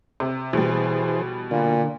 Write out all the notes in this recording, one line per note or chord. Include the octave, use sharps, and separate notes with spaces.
C3
B2 E3 G3 G#4 C5
A#2 D3